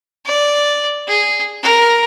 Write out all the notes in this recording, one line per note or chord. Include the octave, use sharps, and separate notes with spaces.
D5
G#4
A#4